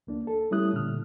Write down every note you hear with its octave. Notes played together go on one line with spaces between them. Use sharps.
D2 A#3 D4
A4
G3 A3 C#4 E4 D#6 F#6
A#2 D3 F6